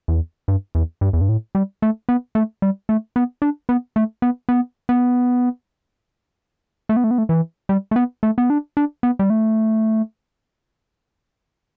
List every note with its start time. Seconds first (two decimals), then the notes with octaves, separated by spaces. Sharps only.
0.08 E2
0.48 G2
0.75 E2
1.01 G2
1.13 E2
1.21 G2
1.29 A2
1.55 G3
1.82 A3
2.09 B3
2.35 A3
2.62 G3
2.89 A3
3.16 B3
3.42 D4
3.69 B3
3.96 A3
4.22 B3
4.49 B3
4.89 B3
6.89 A3
6.96 B3
7.04 A3
7.11 B3
7.18 A3
7.29 E3
7.69 G3
7.91 A3
7.96 B3
8.23 A3
8.38 B3
8.50 D4
8.77 D4
9.03 B3
9.19 G3
9.30 A3